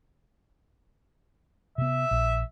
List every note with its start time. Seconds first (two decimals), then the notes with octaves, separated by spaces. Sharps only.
1.78 C3 B3 E5
2.11 A#1